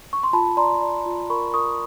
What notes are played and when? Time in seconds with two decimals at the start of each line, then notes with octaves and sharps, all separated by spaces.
0.13 C#6
0.23 C6
0.33 F4 A5 B5
0.57 D5 A#5 C6
0.82 D5
1.06 F4
1.30 A#4 B5 C#6
1.54 A#4 C#6 D#6